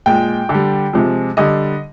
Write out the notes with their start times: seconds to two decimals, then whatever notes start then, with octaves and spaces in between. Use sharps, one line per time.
0.06 A#2 G#3 G5
0.49 D3
0.54 G3
0.93 C3 F3 G#3
1.37 D3 G3 D#5